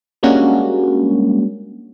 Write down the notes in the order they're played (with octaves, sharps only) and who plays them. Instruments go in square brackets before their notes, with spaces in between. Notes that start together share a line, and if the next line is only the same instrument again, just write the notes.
[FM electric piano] G3 G#3 A#3 C#4 D4 F#4